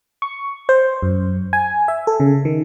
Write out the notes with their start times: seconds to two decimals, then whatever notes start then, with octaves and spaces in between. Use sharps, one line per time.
0.22 C#6
0.69 C5
1.03 F#2
1.53 G#5
1.88 E5
2.07 A4
2.20 C#3
2.45 D#3